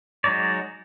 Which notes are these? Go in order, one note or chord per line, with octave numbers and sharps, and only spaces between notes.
F#3 G#3 D#4 C#5 D5